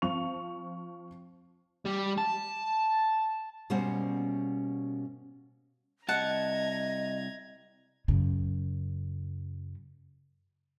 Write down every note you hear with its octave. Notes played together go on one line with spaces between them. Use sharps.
F3 C4 C#6 F7
G3
A5
B2 G3 A#3 C#4 C5 F#5
C2 D#5 F#5 A5 A#5 G#6
F#2 C#3